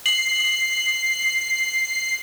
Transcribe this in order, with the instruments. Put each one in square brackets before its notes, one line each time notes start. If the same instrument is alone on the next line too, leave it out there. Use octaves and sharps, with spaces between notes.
[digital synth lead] C7 [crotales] F#7